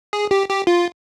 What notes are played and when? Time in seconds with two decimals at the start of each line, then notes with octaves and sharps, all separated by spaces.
0.13 G#4
0.31 G4
0.49 G4
0.67 F4